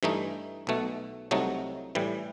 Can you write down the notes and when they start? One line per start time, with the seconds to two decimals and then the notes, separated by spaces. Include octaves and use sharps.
0.03 G2 E3 A3 D#4
0.67 B1 B2 A3
1.31 C2 C3 F#3 A3 D#4
1.95 A2 E3 G3